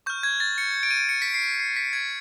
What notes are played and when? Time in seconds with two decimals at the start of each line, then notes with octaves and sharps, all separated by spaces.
0.06 C#6 F6 G6
0.23 G#6
0.40 A6
0.58 C#7
0.83 D7
0.91 D#7
0.97 D7
1.09 C#7
1.22 B6
1.34 C7
1.60 C7
1.76 B6
1.93 G#6